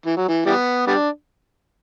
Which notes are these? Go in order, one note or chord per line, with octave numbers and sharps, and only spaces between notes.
E3
F#3
E3
E3 G3 B3
G3 B3 D4